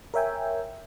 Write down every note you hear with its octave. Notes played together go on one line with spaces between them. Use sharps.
A#4 C#5 E5 G5 G#5